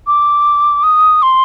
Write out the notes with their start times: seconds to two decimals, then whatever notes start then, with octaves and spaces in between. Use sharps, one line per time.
0.07 D6
0.83 D#6
1.22 C6